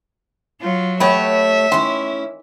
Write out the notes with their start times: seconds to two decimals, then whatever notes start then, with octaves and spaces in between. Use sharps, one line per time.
0.61 F#3 F4
1.00 A3 B3 G4 B4 C#5 E5 G5
1.72 D#3 E3 C#4 E4 C6